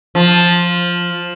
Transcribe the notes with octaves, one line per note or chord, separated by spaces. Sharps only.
F3